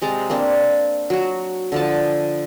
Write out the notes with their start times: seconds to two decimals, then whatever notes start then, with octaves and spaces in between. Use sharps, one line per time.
0.01 C3 G#3 A5 A#5
0.30 A#3 C4 D4
1.10 F#3 F#4
1.72 D3 F3 A5